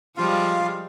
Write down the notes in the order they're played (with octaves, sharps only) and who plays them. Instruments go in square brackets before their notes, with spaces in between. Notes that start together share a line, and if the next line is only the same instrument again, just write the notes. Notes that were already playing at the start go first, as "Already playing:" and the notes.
[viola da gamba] F3 G3 G#3 [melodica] F4 F5